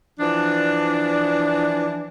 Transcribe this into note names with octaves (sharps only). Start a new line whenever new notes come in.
E3 F3 D4